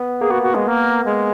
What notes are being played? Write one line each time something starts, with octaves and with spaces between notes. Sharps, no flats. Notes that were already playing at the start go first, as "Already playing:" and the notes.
Already playing: B3
A#3 G#4
B3 F#4
F#4
G#3
A#3
G#3